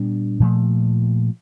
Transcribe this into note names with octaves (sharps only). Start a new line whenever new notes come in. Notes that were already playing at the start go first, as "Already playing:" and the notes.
Already playing: A#2 G3 B3 D4
A#2 F3 A3